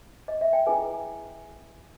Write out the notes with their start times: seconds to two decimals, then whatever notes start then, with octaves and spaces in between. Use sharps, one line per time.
0.28 D#5
0.41 E5
0.53 G5
0.66 E4 G#4 B4 G#5